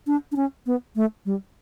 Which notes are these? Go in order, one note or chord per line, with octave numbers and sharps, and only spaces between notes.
D4
D4
C#4
B3
A3
G3